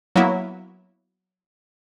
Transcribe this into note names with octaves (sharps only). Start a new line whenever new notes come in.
F#3 A#3 B3 E4